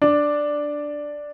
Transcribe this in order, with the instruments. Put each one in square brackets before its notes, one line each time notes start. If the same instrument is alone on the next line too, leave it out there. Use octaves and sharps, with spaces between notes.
[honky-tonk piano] D4